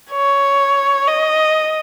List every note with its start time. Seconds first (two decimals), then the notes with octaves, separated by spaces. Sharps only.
0.11 C#5
1.08 D#5